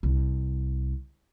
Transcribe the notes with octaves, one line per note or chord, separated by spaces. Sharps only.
C2